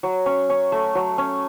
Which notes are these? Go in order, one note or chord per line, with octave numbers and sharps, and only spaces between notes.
F#3
C#4
C#4
A3
F#3
C#4